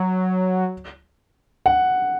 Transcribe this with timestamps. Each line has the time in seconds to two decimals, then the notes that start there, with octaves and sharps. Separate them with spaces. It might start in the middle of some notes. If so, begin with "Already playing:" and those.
Already playing: F#3
1.66 F#5